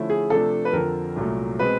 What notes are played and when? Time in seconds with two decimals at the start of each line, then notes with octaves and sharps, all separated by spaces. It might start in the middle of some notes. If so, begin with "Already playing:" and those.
Already playing: D3 F3 A3 C#4 E4
0.10 G#4
0.30 C3 F3 A3 D4 A4
0.65 B4
0.73 F2 D3 F3 A#4
1.16 C2 A#2 F#3 A3
1.59 B2 G#3 C4 B4